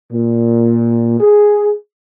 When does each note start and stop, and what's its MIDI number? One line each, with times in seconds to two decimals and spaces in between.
0.12 1.17 46
1.20 1.73 68